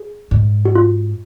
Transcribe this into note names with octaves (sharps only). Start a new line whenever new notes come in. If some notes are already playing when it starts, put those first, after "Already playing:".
Already playing: G#4
G#2
F#4
F4